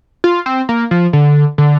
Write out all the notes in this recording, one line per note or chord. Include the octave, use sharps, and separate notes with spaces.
F4
C4
A#3
F3
D3
D3